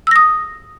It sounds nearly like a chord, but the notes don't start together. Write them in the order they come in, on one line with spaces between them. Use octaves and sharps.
E6 A#6 D#6